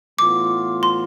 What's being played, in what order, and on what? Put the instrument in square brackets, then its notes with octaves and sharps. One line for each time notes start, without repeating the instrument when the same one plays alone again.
[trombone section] A2 E3 B3 F4 [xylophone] D6
[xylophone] C6